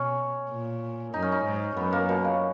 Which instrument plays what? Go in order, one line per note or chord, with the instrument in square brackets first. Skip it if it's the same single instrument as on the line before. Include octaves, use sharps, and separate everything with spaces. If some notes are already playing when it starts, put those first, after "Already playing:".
Already playing: [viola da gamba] B2 [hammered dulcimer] C#4
[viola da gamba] A#2
[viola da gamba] F#2 [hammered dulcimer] D#4
[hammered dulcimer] C#4
D#4
[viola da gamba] G#2
[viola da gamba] F#2 [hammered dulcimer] B3
[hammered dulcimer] A#3
B2
C#3